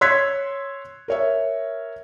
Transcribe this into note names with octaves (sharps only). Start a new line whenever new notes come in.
C#5 C6 E6 F#6 G#6 B6
A#4 C#5 E5